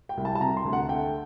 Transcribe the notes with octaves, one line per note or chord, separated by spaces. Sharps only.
G5
C2
A5
A5
C3 A#5
C6
D2
F#5
A3 G5